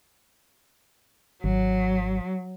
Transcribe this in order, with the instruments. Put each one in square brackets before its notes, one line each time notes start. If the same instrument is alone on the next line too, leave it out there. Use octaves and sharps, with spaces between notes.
[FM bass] G#1 [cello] F#3